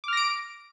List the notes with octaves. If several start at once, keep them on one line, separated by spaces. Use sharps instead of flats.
D6 F6 A#6 D7